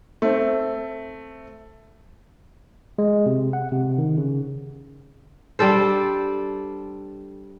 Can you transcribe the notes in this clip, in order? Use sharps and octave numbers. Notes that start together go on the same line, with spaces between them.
A3 C4
G#3
C3
F#5
C3
D#3
C#3
G3 D4 A4 C5